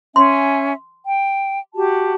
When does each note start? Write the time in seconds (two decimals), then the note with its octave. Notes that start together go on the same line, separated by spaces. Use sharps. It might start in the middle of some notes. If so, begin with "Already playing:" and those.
0.16 C#4 E5 G#5 C6
1.06 G5
1.75 F#4 G4 A5